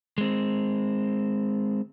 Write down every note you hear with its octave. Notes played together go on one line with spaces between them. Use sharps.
G#3 C4